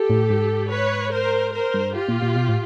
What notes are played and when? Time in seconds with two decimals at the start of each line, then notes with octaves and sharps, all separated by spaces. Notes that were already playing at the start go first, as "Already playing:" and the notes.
Already playing: G4 A4
0.10 A2
0.30 G#2
0.71 B4 C#5
1.12 A#4 C5
1.53 A#4 C5
1.74 G2
1.94 F4 G4
2.08 A#2
2.22 A#2
2.36 B2
2.49 A2